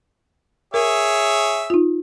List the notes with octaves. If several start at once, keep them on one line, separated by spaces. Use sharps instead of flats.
G#4 A#4 C#5 E5
D#4 F4